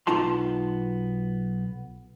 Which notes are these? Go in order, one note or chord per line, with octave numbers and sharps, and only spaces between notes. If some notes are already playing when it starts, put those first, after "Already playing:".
B1 B3 D#4 F4 A5 C6